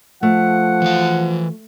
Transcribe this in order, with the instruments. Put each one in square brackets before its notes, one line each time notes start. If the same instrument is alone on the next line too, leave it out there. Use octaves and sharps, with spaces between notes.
[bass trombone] F3 [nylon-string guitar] A3 [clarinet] F#5
[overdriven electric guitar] E3 F5